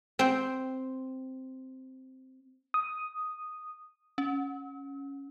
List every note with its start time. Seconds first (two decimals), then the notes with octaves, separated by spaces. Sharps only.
0.19 C4 G5
2.74 D#6
4.18 C#4